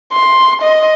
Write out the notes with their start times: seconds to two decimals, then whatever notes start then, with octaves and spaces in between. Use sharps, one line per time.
0.13 C6
0.63 D#5